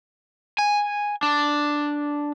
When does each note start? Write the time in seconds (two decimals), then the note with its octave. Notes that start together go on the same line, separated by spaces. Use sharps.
0.58 G#5
1.23 D4